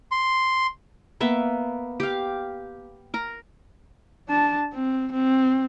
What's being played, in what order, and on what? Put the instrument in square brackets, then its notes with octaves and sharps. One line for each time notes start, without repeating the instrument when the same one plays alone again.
[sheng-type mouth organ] C6
[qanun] A#3 B3 E5
G4 F5
A#4 A#5
[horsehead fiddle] D4 A5
C4
C4